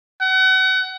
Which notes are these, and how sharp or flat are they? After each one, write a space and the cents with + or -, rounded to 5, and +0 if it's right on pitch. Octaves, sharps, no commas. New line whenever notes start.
F#5 +35